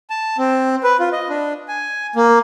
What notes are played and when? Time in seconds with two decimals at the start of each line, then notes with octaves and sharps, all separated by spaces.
0.10 A5
0.38 C4
0.83 B4
1.00 F4
1.12 D#5
1.29 D4
1.68 G#5
2.16 A#3